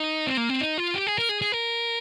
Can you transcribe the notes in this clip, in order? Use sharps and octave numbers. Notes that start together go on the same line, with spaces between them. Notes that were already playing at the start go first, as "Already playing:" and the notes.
Already playing: D#4
C4
A#3
C4
D#4
F4
G4
G#4
A#4
G#4
G#4
A#4